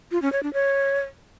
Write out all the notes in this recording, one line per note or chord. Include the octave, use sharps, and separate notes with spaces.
F4
C#4
C#5
D4
C#5